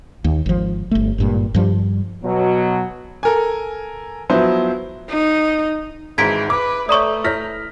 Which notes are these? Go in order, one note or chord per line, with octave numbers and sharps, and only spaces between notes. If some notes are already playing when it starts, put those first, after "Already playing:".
D#2
G#1 F3
G1 A3
G#1 G2 A#2
G2 F3 G3
B2 F#3
A4 A#4 G#5
F3 F#3 B3 E4 C5
D#4
G#1 G#2 E3 A5 G#6 B6 D7
B4 D6
A3 C#5 D5 A#5 C#6 D#6
E4 C#5 F6 A#6 B6